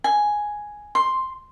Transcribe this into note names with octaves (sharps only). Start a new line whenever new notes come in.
G#5
C6